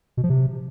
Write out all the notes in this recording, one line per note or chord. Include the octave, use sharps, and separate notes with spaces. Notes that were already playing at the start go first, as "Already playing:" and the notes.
B2
F3
C3